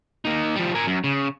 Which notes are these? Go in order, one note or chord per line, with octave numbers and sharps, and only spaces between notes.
A#3 D#4
F3 G3
A#4 G#5
F#2
C#3